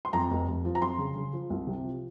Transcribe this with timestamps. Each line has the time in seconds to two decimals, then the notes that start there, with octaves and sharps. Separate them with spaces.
0.05 C6
0.13 F2 A#5
0.30 F1
0.48 F1
0.65 F3
0.75 A#5
0.81 F2 C6
0.98 C#3
1.16 C#3
1.33 F3
1.50 C2
1.67 C3
1.84 F3